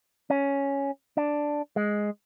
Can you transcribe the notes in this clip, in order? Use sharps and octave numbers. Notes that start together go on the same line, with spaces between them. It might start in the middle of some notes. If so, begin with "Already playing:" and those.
C#4
D4
G#3